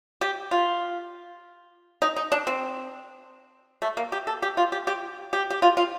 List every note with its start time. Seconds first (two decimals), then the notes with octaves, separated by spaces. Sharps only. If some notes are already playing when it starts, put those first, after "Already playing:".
0.21 G4
0.51 F4
2.02 D#4
2.16 D#4
2.32 D4
2.47 C4
3.82 A3
3.97 A#3
4.12 G4
4.27 A4
4.42 G4
4.57 F4
4.72 G4
4.87 G4
5.33 G4
5.50 G4
5.62 F4
5.77 F4